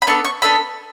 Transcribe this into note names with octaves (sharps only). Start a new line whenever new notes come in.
B5
B3 D4 A4 C#6
C#6
B3 D4 A4 B5